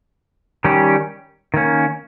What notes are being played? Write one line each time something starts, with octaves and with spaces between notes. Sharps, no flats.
D#3 G3 C#4 G4
D#3 A#3 C#4